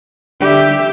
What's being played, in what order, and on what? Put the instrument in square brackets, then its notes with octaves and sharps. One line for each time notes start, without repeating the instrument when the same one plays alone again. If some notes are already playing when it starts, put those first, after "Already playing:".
[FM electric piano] D3 G3 [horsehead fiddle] G4 E5